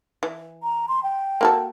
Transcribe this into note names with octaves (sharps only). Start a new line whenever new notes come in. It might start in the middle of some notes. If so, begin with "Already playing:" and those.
E3
A#5
C6
G5
A#3 F#4 A4